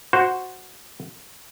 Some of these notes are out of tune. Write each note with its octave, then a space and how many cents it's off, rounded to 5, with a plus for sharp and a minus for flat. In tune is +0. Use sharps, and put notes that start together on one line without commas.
F#4 +0 C5 +0